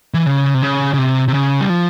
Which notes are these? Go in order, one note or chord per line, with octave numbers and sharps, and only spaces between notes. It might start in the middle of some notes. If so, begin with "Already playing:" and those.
E3
C#3
C3
C#3
C#3
C3
C3
C#3
G3
F3